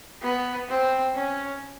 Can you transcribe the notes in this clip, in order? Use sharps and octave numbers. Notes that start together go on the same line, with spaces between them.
B3
C4
C#4